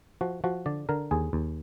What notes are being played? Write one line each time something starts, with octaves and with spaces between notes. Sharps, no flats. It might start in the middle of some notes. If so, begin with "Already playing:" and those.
F3 F#4
F3 F#4
D3 D5
D3 A#4
D#2 G#4
D#2